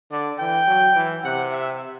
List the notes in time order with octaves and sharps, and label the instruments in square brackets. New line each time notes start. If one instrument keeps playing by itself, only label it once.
[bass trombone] D3 [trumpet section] D5
[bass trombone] E3 [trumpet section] G5
[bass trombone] F#3
E3
[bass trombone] C3 [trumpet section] F#5
[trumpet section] E5